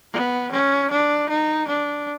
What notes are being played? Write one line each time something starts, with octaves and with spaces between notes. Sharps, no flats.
B3
C#4
D4
D#4
D4